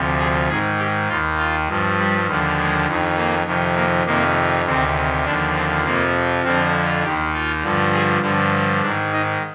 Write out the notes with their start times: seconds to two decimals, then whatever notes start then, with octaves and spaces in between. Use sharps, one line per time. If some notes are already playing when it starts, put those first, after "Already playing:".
Already playing: D2 C3 F3
0.19 G#4
0.49 G#2 D#3 G#4
0.79 G4
1.08 D#2 D#3 F4
1.37 F4
1.68 G2 F3
1.98 G3
2.26 D#2 D3 F3
2.56 G#3
2.87 F2 D#3
3.17 A#3
3.46 F2 C3 D#3
3.76 A#3
4.06 F2 C3 D#3 A#3
4.65 D2 C3 D#3 C4
5.24 D#2 D3 F3 D4
5.55 C4
5.84 F2 C3 F3 A#3
6.43 F2 D3 F3 C4
7.03 D#2 D#3 G4
7.33 F4
7.63 G2 D3 F3
7.93 G#4
8.22 G2 D3 F3 G4
8.82 G#2 D4
8.87 D#3
9.12 D#4